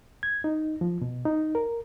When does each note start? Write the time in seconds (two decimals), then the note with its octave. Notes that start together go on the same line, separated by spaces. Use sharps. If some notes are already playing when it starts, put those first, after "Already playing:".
0.23 G#6
0.44 D#4
0.81 F3
1.02 B2
1.25 D#4
1.55 A#4